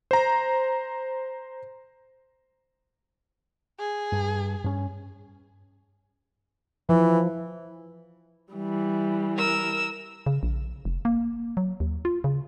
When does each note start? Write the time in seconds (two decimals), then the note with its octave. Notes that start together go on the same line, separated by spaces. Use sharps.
0.11 C5 A#5
3.79 G#4
4.12 G2
4.64 G2 C#4
6.89 E3 F3
8.53 E3 G3
9.37 A#4 E6
10.26 C#3
10.43 A#1
10.85 F1
11.05 A#3
11.57 F#3
11.80 D#2
12.05 F4
12.24 C#3